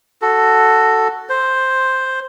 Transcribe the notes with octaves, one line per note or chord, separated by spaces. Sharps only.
F#4 A4
C5